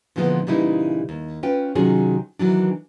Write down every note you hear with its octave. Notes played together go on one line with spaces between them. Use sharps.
A#2 D3 E3 F3 G#3 B3
A#2 C#3 E3 G3 D#4 E4
D#2
C#4 F4 B4 G5
C3 D#3 F#3 C#4 F4 G#4
D#3 E3 F#3 D4